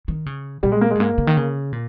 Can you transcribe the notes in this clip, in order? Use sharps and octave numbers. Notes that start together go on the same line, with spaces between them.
D#3
C#3
A#2 G3
G#3
A#3
G#3
G2
G#2 A#3
C#3
D#3
C#3
A#2